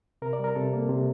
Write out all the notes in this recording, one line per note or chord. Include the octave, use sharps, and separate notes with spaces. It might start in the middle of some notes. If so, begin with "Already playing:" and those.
C3 A#4
D5
G3 A#4
C3 A4
A#3
C3